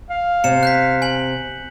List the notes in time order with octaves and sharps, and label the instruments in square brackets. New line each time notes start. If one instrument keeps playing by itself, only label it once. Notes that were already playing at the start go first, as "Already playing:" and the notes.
[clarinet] F5
[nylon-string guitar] C3 [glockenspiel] C#7 E7
[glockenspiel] F#6 G6 B6
G#5 F#7